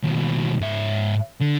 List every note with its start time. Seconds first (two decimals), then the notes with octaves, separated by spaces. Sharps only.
0.03 D#2 B2
0.60 G#2 E5
1.40 D3